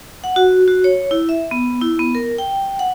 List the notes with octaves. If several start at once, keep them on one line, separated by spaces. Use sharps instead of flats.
F#5
F#4
F#4
C#5
E4
E5
B3
E4
B3
A#4
G5
F#5